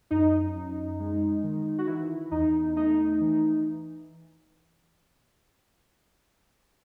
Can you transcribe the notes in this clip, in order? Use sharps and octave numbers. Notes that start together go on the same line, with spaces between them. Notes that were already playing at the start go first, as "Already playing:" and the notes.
F#2 D#4
F#2
G#3
D#3
F#4
E3 E4
E2 D#4
A3 D#4
E3